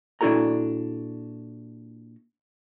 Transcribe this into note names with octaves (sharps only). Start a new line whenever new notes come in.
A#2 D4 E4 F#4 A4 A#5